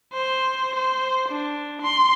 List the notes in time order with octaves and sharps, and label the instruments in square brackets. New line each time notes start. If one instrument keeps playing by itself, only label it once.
[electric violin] C5
C5
D4
C6